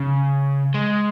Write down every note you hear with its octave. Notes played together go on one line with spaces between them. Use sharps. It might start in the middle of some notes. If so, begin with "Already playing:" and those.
Already playing: C#3
G#3